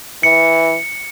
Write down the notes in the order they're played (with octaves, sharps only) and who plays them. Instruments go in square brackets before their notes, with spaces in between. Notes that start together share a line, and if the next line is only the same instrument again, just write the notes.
[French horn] E3 [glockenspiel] C#7